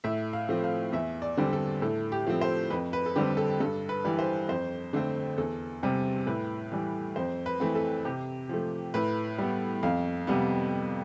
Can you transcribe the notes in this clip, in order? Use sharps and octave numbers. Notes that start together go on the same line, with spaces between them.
A2 E5
F5
F3 A3 C4
F5
E2 E5
D5
D3 G3 C4
A4
A2 A4
G4
F3 A3 C4
C5
F2 B4
B4
A4
D3 G3 C4 G4
A4
G2 A4
B4
E3 G3
C5
F2 C5
D3 A3 C4
E2 A4
C3 G3 C4
A2 B4
E3 G3
F2 C5
B4
E3 A3 C4
A4
C3 G4
F3 A3
A2 B4
G3 B3
F2 F5
C3 G3 B3